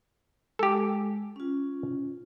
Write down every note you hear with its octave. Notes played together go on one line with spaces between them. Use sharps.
G#3 G4 A4
C#4 F4